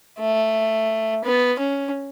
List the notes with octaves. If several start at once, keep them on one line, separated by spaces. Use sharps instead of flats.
A3
B3
C#4